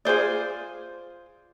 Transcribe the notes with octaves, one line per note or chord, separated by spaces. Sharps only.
F4 G#4 C5 D5